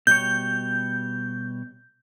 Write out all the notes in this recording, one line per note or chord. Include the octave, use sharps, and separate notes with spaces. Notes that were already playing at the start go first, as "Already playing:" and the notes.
B2 G3 C#5 G6